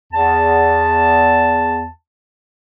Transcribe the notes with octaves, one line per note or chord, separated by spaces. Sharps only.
E2 A5